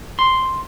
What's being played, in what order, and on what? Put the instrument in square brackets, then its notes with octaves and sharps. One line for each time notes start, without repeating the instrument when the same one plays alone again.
[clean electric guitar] C6